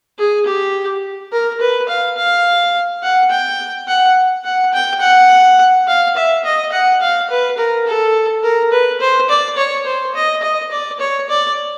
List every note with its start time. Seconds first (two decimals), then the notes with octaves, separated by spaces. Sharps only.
0.19 G#4
0.46 G4
1.32 A#4
1.61 B4
1.88 F5
2.17 F5
3.03 F#5
3.31 G5
3.88 F#5
4.44 F#5
4.73 G5
5.01 F#5
5.88 F5
6.16 E5
6.44 D#5
6.72 F#5
7.01 F5
7.30 B4
7.58 A#4
7.87 A4
8.43 A#4
8.71 B4
9.00 C5
9.29 D5
9.57 C#5
9.85 C5
10.15 D#5
10.42 D#5
10.71 D5
11.00 C#5
11.29 D5